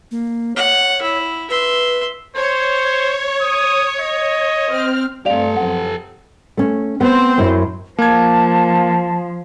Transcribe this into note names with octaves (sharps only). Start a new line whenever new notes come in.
A#3
C#5 F#5
E4
B4 E5 C6
C5 C#5
D#6
D#5
C4 F6
G2 A3 C4 G4 A4 D5 F5 F7
F#2 F3 F#5
A3 C#4
B3 C4 C5
F#2 F#3 E4
F3 A#3 A5 G#6